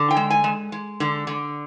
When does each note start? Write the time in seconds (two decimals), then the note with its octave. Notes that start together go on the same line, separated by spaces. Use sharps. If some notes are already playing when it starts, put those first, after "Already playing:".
Already playing: D3
0.11 G5
0.17 G#3
0.30 G#5
0.44 G#3
0.72 G#3
1.00 D3
1.27 D3